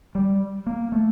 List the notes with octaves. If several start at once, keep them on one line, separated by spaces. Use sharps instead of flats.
G3
A#3
A3